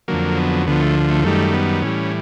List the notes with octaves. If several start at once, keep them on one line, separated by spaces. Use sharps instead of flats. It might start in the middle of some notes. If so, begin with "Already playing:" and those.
F2 D3 F#3 A#3
B3
D2 D3 F3 B3
A3
A3
F#2 D#3 G3 A3
B3
A2 E3 G3 C#4